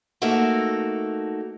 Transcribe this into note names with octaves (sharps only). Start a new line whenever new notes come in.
A3 A#3 D#4 F#4 A4